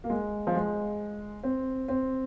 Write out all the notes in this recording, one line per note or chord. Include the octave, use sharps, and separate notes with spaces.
A#3
G#3
F3
G#3
C4
C4